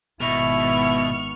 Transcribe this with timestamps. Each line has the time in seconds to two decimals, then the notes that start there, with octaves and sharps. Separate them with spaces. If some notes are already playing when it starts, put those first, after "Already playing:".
0.21 G#1 B2 B3 E4 C#6 F6